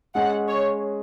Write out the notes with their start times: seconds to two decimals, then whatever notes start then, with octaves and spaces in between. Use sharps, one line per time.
0.15 G#3 C#4 G#4 D#5 F#5
0.48 C#5